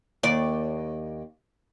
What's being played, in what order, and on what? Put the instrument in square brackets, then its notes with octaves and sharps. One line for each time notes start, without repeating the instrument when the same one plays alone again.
[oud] D#2 D5